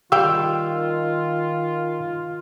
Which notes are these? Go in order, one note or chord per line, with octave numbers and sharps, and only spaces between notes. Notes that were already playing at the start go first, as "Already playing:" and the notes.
D#3 G3 F4 F5 G5 E6